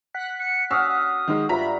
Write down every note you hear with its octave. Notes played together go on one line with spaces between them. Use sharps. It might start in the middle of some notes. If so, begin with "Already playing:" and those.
F#5 F#6 B6
C#7
C#4 F#4 F5 D#6 E6
D#3 G#3
G2 F4 E5 A#5 B5 B6